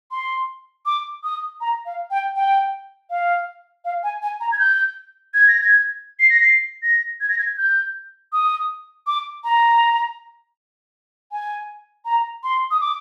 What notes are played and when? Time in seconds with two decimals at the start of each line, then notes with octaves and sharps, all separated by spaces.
0.11 C6
0.86 D6
1.24 D#6
1.61 A#5
1.86 F5
2.11 G5
2.36 G5
3.10 F5
3.85 F5
4.03 G#5
4.22 G#5
4.40 A#5
4.52 G#6
4.59 G6
5.34 G#6
5.48 A#6
5.61 G#6
6.19 C7
6.30 A#6
6.40 C7
6.83 A#6
7.21 G#6
7.29 A#6
7.39 G#6
7.58 G6
8.33 D#6
9.07 D6
9.44 A#5
11.32 G#5
12.05 A#5
12.43 C6
12.71 D#6
12.81 D6